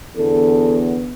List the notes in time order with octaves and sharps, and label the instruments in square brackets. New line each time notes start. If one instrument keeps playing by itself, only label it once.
[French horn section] E2 D3 B3 A4